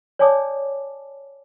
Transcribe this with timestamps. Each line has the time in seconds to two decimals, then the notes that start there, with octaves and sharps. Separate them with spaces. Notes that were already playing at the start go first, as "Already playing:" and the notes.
0.19 C#5 D5 G#5 A5 D6 D#6